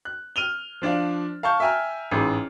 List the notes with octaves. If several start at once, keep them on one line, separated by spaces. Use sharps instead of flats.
F#6
F6 D#7 F7 G7
F3 D4 D5 F5
F5 A5 C#6 G6
E5 G5 G#5 A#5 F6
A1 G#2 G#4